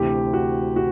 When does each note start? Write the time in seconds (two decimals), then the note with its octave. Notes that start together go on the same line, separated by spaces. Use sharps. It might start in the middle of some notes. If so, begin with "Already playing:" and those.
Already playing: D2 C3 E3 G4
0.33 F#4
0.76 F#4